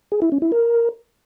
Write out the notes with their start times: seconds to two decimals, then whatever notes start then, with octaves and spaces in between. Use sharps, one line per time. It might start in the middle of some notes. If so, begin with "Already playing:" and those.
0.12 G#4
0.22 E4
0.32 C#4
0.42 E4
0.52 A#4